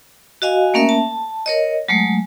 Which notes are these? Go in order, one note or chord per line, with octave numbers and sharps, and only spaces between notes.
F#4 D#5 F5 G#5
A3 A#3 C#4 A#4 E5
A5
A#4 C#5 D#5
F#3 G#3 A3